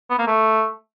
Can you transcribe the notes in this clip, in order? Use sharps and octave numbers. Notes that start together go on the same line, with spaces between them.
B3
A#3
A3